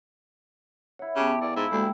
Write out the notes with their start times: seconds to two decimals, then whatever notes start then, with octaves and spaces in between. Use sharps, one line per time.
0.99 E4 C#5 F#5
1.16 C#3 B3 G4 G5 A5
1.41 E2 A4 D5 F5 G#5
1.56 G#2 E4
1.72 D2 G#3 A#3 G4 B5